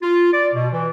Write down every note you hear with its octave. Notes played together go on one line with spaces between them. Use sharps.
F4
D5
B2
E3